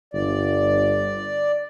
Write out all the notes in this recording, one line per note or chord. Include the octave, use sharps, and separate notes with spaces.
G1 D5